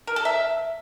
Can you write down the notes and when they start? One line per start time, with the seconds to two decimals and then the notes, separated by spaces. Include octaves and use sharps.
0.07 A#4
0.16 A4
0.25 E5